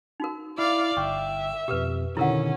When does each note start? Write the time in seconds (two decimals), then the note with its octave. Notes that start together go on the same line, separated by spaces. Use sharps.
0.20 D#4 F#4 A#4
0.58 E4 D5 F5
0.97 G1 E5 G5 C#6
1.68 F2 B2 G4 A#4 B4
2.17 B2 D3 D#3 C#4 E4 A#4 F#5